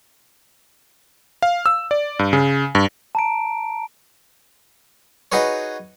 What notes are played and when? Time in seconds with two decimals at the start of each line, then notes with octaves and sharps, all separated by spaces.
1.42 F5
1.66 E6
1.91 D5
2.19 G2
2.33 C#3
2.75 G2
3.15 A5 A#5 D7
5.32 D#4 F#4 G#4 B4 C#5